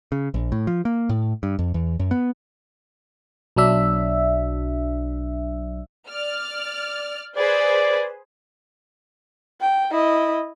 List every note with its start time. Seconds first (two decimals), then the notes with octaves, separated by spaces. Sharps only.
0.12 C#3
0.34 A#1
0.52 A2
0.67 F3
0.85 A#3
1.09 A2
1.43 G2
1.59 F2
1.74 E2
1.99 F#2
2.11 B3
3.56 B1 F#3 D4 E5
6.08 D5 F6
7.37 G#4 B4 C5 D5
9.61 G5
9.91 E4 D#5